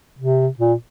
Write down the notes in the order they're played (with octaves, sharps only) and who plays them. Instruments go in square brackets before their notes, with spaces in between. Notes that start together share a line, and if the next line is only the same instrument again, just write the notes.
[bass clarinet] C3
A#2